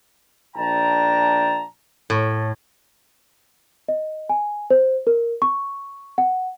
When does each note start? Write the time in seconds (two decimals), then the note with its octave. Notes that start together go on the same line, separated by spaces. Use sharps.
0.57 A#1 D4 G5 A5 A#5
2.10 A2
3.88 D#5
4.29 G#5
4.70 C5
5.07 A#4
5.42 C#6
6.18 F#5